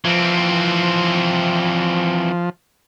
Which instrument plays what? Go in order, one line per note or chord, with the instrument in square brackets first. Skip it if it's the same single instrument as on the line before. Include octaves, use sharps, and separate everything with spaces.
[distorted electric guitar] E3 C4 [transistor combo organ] F3